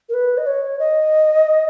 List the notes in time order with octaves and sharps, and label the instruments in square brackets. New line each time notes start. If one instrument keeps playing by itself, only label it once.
[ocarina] A#4
B4
D#5
C#5
D#5